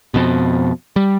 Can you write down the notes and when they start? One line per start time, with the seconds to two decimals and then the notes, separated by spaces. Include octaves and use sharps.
0.14 F2 B2
0.96 G3